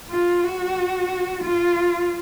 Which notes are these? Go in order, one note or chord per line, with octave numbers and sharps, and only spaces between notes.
F4
F#4
F4